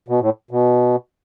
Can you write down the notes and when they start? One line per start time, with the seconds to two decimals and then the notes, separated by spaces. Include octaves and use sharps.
0.08 B2
0.21 A2
0.51 B2